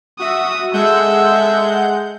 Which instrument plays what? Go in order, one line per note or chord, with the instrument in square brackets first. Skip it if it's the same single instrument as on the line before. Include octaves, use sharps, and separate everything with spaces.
[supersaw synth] F#4 E5 [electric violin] D#6
[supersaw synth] G#3 F#5 G6 [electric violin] A4 E5